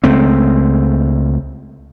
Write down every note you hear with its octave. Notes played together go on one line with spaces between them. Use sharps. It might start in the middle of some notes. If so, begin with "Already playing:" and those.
C#2 A3 C4